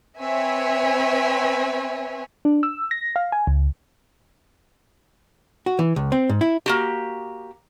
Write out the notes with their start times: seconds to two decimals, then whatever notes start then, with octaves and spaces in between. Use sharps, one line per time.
0.19 C4 B4 C#5 E5 G#5
2.45 D4
2.63 E6
2.91 A#6
3.16 F5
3.32 G#5
3.47 C#2
5.66 F#4
5.79 E3
5.96 C#2
6.12 C4
6.30 G#2
6.41 E4
6.66 A#3 F#4 G4